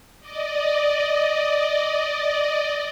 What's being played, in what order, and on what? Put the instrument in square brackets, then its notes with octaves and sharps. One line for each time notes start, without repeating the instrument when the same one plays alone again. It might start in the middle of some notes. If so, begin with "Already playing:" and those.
[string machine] D5 D#5